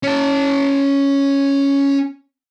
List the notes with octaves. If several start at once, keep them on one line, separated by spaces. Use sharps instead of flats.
C#4 A5